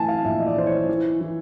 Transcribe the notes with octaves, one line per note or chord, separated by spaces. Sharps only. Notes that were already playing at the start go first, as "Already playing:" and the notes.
Already playing: A2 E3 G#5 A5
F5
A#1 E5
D#5
D5
E3 C5
C#5
E3
E3